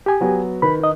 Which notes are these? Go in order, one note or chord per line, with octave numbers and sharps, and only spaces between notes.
G4 G#5
F#3 B3 F#4
D#3 B4 B5
D#4 D#5